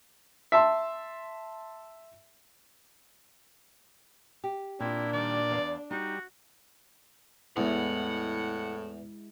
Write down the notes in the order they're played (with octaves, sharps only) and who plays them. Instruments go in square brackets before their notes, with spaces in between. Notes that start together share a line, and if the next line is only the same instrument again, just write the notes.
[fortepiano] E5 A5 C6
[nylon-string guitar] G4
[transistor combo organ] A#2 [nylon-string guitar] C4 F4 [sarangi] D4 [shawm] E4
[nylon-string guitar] D#3 G3 [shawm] D5
[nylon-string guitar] E2 B3 F5
[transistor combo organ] G3 [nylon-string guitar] D#4 [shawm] F#4
[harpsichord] E2 [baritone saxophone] A2 [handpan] G#3 E4 [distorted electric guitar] F#5